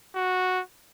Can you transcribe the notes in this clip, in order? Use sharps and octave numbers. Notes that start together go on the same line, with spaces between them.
F#4